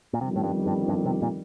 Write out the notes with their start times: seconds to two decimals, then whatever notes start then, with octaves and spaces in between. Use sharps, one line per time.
0.13 A#2
0.21 G1 F2 C3 D#3 G3
0.36 A2
0.43 G2
0.66 G2
0.88 G2
1.05 C3
1.22 A#2